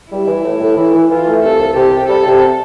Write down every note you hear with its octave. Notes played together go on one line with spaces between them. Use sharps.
G3 E4
E3
A2
A2
E3
E3
E3 F4
A3
C2 A4
C2
C3 G4
C3
G3 A4
C3